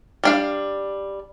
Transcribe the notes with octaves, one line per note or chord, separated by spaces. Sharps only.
G3 D4 F5